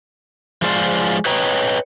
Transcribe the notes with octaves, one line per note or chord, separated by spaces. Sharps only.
F3 G#3 F4 C5 D5
B4 C#5 D#5 G5 A#5